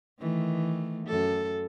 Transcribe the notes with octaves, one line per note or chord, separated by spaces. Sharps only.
D#3 E3 A3
F#2 A4